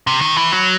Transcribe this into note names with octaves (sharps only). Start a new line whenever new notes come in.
C3
D#3
E3
F#3